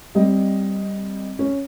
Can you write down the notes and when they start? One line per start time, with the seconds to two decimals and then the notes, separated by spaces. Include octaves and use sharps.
0.15 G3 C4 D#5
1.39 C#4